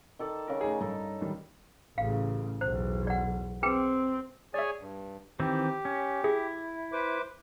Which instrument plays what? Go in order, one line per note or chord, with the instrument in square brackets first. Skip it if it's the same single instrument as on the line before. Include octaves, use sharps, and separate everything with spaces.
[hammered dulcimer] D#3 A4 D5
C#3 A#4
[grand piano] A3 D#4 G#4
[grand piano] G2 [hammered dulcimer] D#4 A4
[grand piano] D#3 G3
[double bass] A1 C#3 [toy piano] F5
[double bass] B1 E2 [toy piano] C5
[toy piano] D5 F#5
[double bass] C4 [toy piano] G#4 B4 G5
[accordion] G#4 C#5 G#5 [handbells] D5 E5
[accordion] G2
[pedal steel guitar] D#3 E3 C4 [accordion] G4
[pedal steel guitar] C#4
[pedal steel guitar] E4 [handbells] G#4
[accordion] B4 C5 D6